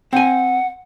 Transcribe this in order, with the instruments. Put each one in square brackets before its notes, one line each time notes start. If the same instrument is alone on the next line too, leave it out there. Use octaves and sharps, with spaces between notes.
[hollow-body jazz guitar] C4 G#5 [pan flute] F#5